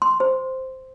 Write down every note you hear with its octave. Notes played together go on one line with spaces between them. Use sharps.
C6
C5